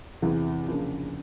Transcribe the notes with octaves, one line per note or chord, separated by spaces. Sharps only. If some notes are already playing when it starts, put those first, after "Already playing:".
E2 C3 E3
C#3 F3 A#3 D4